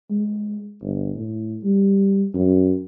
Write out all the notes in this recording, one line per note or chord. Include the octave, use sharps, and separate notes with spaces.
G#3
G1
A2
G3
F#2